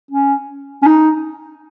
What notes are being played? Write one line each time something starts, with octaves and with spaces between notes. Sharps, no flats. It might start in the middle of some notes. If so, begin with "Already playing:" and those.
C#4
C#4
D#4